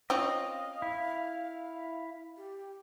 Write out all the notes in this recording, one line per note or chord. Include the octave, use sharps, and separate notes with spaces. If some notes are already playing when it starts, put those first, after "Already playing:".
C4 C#4 F4 D#5 F5
E4
G4